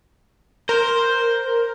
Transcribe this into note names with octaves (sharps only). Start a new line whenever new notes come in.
A#4 C5